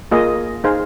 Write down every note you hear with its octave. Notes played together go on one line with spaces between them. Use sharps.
A#3 F4 G#4 D#5
D#4 G#4 C5 F5